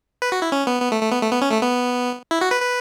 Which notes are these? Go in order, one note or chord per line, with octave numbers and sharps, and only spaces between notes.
B4
F#4
E4
C#4
B3
B3
A3
A3
B3
A3
B3
C#4
A3
B3
E4
F#4
B4
B4